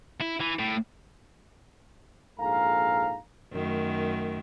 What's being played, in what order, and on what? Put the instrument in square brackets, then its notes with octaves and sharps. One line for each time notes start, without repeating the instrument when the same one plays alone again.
[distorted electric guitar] E4
E3
A2
[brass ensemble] A#1 G#2 A4 F5 G#5 A#5
[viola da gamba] F#2 D#3 A3